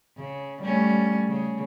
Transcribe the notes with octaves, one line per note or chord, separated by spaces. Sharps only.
C#3
G3 A3 C#4
C#3